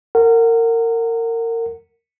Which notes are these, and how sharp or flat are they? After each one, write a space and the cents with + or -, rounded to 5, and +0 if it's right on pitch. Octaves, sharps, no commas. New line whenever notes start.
A#4 -25 F#5 +0